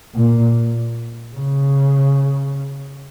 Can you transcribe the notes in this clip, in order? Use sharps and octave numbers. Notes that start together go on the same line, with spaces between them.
A#2
C#3